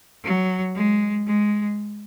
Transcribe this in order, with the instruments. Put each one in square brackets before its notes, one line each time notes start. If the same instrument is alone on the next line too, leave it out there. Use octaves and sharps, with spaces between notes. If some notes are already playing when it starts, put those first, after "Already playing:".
[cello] F#3
G#3
G#3